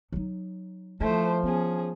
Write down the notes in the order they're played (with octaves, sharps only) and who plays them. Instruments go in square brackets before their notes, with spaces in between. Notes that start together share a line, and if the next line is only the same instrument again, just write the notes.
[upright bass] F#3 D#4
[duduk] F3 [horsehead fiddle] A3 C5 [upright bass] E4
[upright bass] B3 [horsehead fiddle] C#4 G#4